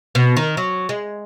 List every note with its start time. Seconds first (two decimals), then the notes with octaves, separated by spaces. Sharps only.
0.15 B2
0.37 D#3
0.57 F#3
0.89 G#3